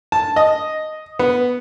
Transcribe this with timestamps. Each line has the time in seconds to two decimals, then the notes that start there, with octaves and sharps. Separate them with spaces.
0.12 A5
0.36 D#5
1.19 B3